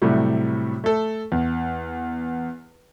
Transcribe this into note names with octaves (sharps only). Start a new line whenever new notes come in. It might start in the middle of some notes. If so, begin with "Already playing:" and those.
A2 C3 F#3 G3 A3
A3 A4
E2